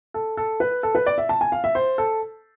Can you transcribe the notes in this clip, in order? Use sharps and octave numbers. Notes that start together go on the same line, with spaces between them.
A4
A4
B4
A4
B4
D5
E5
A5
G#5
F5
E5
C5
A4